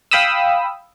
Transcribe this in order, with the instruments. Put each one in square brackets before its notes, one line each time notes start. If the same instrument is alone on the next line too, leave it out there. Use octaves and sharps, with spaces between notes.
[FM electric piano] F5 G5 B5 D#6 E6